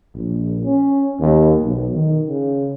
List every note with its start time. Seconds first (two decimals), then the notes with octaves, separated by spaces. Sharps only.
0.14 A#1
0.64 C#4
1.20 D#2
1.61 B1
1.94 D#3
2.27 C#3